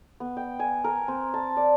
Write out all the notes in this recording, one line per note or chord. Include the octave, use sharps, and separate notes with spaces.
B3
G5
G#5
A#4
C4
A5
D5